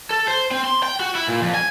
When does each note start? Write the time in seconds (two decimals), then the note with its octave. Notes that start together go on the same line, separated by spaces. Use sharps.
0.10 A4
0.28 C5
0.51 C4
0.65 C6
0.83 G5
1.00 F#4
1.15 E4
1.28 A#2
1.42 F2
1.54 G#5